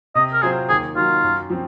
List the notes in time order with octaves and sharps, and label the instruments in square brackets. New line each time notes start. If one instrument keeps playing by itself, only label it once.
[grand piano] C3 [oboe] D#5
[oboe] A#4
[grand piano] F#3 C4 F4 C5 [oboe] G#4
[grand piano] D#2 [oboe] G#4
[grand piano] D#3 F#3 [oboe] F4
[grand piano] F#2
F3 C4